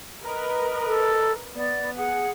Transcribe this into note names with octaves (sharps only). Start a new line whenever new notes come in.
A#4 B4 D#5
A4
B3 D5
G#4 F#5